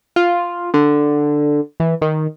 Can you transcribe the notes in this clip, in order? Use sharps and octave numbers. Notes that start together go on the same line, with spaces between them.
F4
D3
E3
D#3